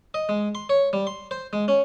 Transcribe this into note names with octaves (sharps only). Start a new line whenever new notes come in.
D#5
G#3
C6
C#5
G3
C6
C5
G#3
C#4